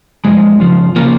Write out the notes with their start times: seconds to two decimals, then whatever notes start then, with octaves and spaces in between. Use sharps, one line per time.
0.25 F2 C#3 F3 G#3
0.60 F2 C#3 F3
0.96 C#3 F3 A#3